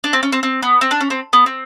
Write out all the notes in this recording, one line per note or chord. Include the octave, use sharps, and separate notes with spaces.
D4
C4
C#4
C4
C4
B3
C4
D4
C#4
C4
B3
C4